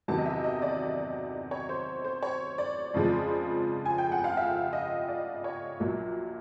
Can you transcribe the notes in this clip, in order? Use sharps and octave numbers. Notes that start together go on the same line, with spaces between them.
E2 C3 D#3 F#3 A5
D#5
E5
D#5
D5
C#5
C5
C5
C#5
D5
F2 C#3 F3 G#3
G#5
G5
F#5
F5
E5
D#5
D5
C#5
A#1 A#2 F#3 A#3